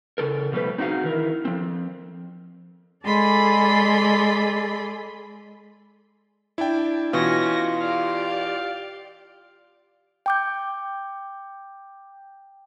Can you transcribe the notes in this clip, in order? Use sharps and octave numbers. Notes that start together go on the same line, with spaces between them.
C#3 A4 A#4
B2 F3 G3 A3 B4 C5
C4 D#4 F#4 G#4 F5
D#3 E3 A#4
F3 C4
G#3 G#4 A4 D5 B5 C6
D4 E4 G5
B2 E3 C#4 F4 A#6
G4 D5 F5
G5 D6 G6